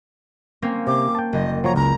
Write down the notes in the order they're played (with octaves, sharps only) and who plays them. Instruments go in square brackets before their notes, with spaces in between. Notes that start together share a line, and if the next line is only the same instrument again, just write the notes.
[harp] A#3 C4 C#4
[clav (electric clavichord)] C3 [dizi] D6
[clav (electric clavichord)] G5 A5
[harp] F#1 [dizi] D#5
[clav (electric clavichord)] F3 F#3 C#5 [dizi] A#5
[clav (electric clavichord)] C#2 [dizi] A#5